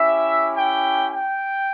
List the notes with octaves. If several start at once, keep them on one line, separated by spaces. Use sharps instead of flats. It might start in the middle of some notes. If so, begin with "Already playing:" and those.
Already playing: C#4 E4 G4 E5
G5
G5